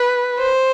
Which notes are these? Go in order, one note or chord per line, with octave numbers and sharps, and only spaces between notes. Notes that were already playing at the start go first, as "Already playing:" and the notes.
Already playing: B4
C5